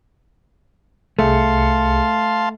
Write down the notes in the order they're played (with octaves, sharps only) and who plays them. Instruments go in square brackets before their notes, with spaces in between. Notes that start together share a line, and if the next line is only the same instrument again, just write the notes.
[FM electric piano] C2 G#4 C#7 [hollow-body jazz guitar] A3 [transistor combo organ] F5 A5 C6